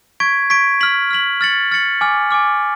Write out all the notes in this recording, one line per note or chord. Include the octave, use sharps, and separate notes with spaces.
C#6 G#6 B6 D7
C#6 G#6 B6 D7
F6 B6 F#7
F6 B6 F#7
F6 A6 C#7 F#7
F6 A6 C#7 F#7
G#5 D6 F6
G#5 D6 F6